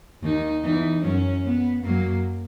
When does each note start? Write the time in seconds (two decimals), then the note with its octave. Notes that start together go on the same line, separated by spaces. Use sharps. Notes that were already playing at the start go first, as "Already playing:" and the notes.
0.24 D#2 D#3 D#4
0.63 E2 E3 D#4
1.03 F#2 F#3 C#4
1.44 B3
1.83 F#2 F#3 A#3